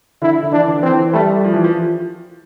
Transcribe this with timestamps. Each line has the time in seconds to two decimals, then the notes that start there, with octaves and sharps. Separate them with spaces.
0.22 D3 E4
0.43 D3
0.52 E3 D4
0.67 D3
0.82 E3 C4
1.13 G3 A3
1.44 F3
1.54 E3
1.64 F3